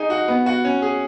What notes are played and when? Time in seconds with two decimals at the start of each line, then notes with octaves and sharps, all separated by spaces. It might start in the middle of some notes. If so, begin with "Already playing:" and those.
Already playing: D#4 G#4
0.10 F#4
0.28 B3
0.46 F#4
0.65 C#4
0.82 G#4